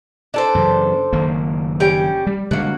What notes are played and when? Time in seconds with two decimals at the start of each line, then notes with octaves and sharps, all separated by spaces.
0.34 D4 A4 C5
0.55 F#2 C#3 E3
1.13 F#1 D#3 A#3
1.80 G3 C#4 G5
2.27 G3
2.51 D3 G3 G#3 A#3 F#4